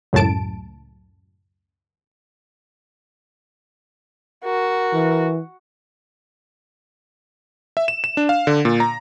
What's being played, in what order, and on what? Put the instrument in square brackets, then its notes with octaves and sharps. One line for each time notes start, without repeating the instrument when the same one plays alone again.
[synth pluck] C#2 F#2 A2 A5 D7
[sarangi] F#4 [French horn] A#4
[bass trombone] E3
[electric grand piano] E5
E7
E7
D4
F5
D3
A#2
A#5